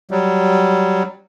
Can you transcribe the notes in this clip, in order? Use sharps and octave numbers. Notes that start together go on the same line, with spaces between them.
F#3 G3